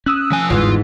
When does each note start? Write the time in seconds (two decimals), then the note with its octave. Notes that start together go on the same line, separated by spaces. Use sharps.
0.06 C#4 D#6 E6 F#6
0.32 F3 G#5
0.50 G1 E2 G#2 E3 F4